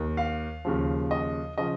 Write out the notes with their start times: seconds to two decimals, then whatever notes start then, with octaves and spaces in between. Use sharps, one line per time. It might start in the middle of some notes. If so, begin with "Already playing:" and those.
Already playing: D#2 D#3
0.17 F5
0.65 D#2 C#3 F3
1.11 D#5
1.58 C#3 F3 D#5